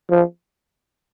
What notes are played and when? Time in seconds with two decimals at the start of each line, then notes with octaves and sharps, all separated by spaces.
0.10 F3